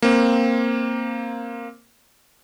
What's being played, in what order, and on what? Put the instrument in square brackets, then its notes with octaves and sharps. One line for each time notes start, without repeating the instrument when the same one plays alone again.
[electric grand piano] A#3 C4